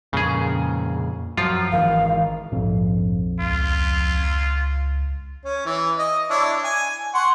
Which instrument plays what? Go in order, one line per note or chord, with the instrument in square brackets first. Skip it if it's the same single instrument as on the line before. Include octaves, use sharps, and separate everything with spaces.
[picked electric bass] F2 A#2 [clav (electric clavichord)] C#3 G#4
[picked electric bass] F#2 [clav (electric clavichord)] F3 F4
[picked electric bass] G#1 D#3 E3 [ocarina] F5
[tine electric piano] A#1 F2 [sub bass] G#2
[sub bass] C#2 [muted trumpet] F4
[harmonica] C#4
E3
D#5
D4 E4 C#5
G#5
F#5 C6 C#6